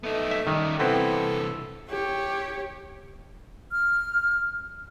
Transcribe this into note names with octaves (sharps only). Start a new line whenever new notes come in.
A3 B3 D#4
E5
D#3 G3 C#4
C3 E3 B3 C4 E4 A4
G4 C#5
F6